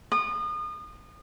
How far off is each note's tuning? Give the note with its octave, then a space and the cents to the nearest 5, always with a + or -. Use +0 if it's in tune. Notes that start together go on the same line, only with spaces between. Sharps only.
D#6 -35